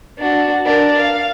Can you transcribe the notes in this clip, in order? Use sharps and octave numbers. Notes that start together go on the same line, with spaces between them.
D4 F#4
D4 A#4
F5